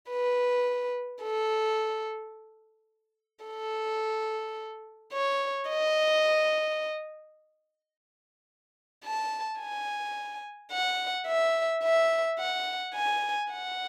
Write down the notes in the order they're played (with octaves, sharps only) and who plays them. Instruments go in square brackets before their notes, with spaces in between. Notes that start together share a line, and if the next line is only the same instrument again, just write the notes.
[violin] B4
A4
A4
C#5
D#5
A5
G#5
F#5
E5
E5
F#5
G#5
F#5